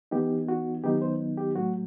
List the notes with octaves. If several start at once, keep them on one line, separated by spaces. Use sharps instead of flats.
E3 B3 D#4 G4
F#4
D#3 F#3 B3 D#4 G4
C5
G4
A2 F#3 A3 F#4